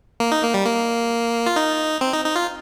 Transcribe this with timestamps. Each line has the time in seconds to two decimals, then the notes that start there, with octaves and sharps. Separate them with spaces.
0.20 A#3
0.32 D#4
0.43 A#3
0.54 G3
0.66 A#3
1.46 F4
1.56 D#4
2.01 C4
2.13 D#4
2.25 D#4
2.36 F4